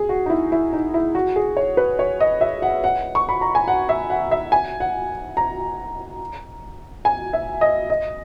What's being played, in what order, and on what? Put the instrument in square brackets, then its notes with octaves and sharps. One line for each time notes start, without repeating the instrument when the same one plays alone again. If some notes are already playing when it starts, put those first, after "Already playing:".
Already playing: [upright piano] G#4
F#4
D#4
E4
E4
D#4
E4
F#4
G#4
C#5
B4
C#5
D#5
E5
F#5
F#5
C#6
B5
A#5
G#5
F#5
E5
F#5
E5
G#5
F#5
A#5
G#5
E5
D#5
D#5